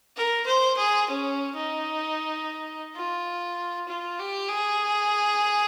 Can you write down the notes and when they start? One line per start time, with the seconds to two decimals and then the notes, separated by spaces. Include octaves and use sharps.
0.17 A#4
0.47 C5
0.78 G#4
1.09 C#4
1.55 D#4
2.95 F4
3.88 F4
4.19 G4
4.49 G#4